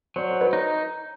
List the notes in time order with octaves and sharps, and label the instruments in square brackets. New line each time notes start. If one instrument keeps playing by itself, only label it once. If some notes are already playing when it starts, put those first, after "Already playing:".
[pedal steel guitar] F#3 [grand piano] C5 D5
[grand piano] C5
B4 C#5
[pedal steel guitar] D#4